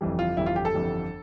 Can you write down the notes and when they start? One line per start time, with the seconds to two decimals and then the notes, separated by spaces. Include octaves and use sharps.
0.01 G1 F2 E3 G3
0.19 F4
0.37 G1 F2 E3 G3 E4
0.46 F4
0.56 G4
0.65 A4
0.74 G1 F2 E3 G3